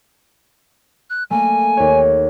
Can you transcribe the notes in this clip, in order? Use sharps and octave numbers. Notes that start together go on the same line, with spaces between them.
F#6
A3 A#3 G#5
D#2 C#5